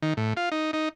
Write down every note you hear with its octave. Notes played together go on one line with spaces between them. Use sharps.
D#3
A2
F4
D#4
D#4